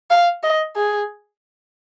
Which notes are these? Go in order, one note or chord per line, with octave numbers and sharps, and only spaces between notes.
F5
D#5
G#4